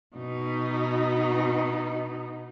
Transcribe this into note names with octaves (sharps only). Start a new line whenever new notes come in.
B2 D#4